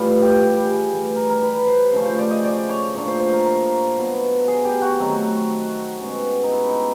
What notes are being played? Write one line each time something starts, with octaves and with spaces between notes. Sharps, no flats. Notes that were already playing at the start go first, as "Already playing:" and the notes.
Already playing: A2 E3 G3 F4
G4
G4
G4
G#4
A2 E3 G3
A#4
A#4
B4
C5
C#3 F3 A3 C#4
C5
D5
D#5
D5
C#5
A#2 F3 A3 D4 C#5
C5
C5
A#4
A#4
B2 F#3 B3
G#4
G4
F#4
D#3 F#3 A3 C4
B2 G#3 C#4
D#4
E4
D#4